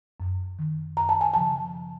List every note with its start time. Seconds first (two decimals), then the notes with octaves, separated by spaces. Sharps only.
0.20 F#2
0.59 D#3
0.97 F#2 A#5
1.09 A5
1.21 G#5
1.33 C#3 F3 A5